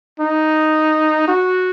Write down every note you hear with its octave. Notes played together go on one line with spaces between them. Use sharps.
D#4
F#4